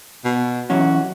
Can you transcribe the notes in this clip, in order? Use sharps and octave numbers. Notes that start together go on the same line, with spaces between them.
B2
E3 F#3 C#4 F#4